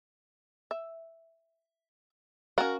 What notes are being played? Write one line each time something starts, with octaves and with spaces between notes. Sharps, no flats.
E5
C#4 F#4 A#4 F5